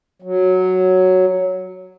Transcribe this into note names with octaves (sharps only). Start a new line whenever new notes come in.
F#3